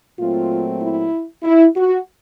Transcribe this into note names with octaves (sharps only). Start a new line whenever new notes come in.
A#2 F#3 A3 C4 F4
E4
E4
F#4